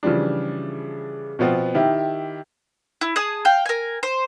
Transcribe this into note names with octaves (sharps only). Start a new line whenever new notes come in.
C#3 E3 F3 G3 D4
B2 F3 B3 C4 F4
D#3 E4 G4
E4
G#4 A5 D#6
F5 G5
A#4 G#5
C5